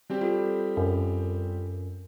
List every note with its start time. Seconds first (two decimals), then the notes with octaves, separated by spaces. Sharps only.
0.10 G3 C4 G4
0.21 F4 A4
0.77 F#2